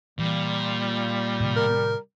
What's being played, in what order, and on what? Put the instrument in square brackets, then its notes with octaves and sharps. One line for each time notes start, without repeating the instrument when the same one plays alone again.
[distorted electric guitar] A#2 [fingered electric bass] E3 [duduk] G3
[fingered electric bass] A2 C3 D#3
[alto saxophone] A#4